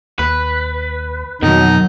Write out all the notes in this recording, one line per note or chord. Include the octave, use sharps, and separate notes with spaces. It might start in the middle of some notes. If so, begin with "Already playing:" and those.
D#2 B4
F2 B2 D#3 F#3 D#4